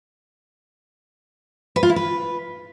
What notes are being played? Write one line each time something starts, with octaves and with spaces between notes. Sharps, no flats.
B4
F4
E4
B4